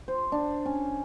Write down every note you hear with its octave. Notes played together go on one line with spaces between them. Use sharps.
C5
D4
C#4